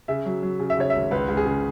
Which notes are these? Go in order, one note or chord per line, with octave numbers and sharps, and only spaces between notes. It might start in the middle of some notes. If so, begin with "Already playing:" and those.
C#3 E5
F#3
F#3
C#3
E5
C#3 C#5
G#1 E5
C#2 B4
C#2
G#4
C#3